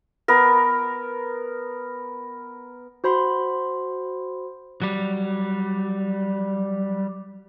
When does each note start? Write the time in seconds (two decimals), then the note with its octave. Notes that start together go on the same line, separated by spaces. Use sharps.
0.28 B3 A#4
3.04 F#4 C5 B5 C6
4.82 F#3 G3